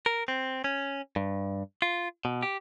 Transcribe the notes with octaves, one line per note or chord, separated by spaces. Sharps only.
A#4
C4
C#4
G2
F4
B2
G4